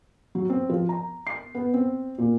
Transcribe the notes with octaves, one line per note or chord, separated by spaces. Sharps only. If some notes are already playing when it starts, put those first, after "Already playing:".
F#3
C4
F3
A#5
C7
B3
C4
A#2